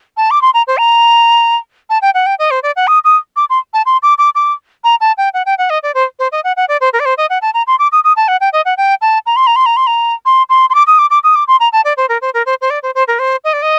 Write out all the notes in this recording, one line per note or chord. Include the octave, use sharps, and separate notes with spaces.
A5
D6
C6
A#5
C5
A#5
A5
G5
F#5
G5
D#5
C5
D5
F#5
D#6
D#6
D6
C6
A5
C6
D6
D6
D6
A#5
A5
G5
F#5
G5
F#5
D#5
D5
C5
C5
D#5
F#5
F#5
D5
C5
A#4
D5
C5
D#5
F#5
A5
A#5
C6
D6
D#6
D#6
A5
F#5
G5
D#5
F#5
G5
A5
A#5
C6
A#5
C6
A#5
C6
A#5
C6
C6
C6
D6
D#6
D6
D6
D#6
D6
C6
A#5
A5
D5
C5
A#4
C5
A#4
C5
C5
D5
C5
C5
A#4
C5
D#5
D5
D#5